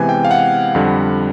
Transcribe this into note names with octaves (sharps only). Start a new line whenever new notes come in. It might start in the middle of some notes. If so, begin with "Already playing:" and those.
Already playing: C3 E3 G#3 B3 G#5
G5
F5
F#5
F2 D3 G3